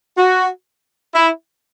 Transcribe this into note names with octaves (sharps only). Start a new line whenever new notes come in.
F#4
E4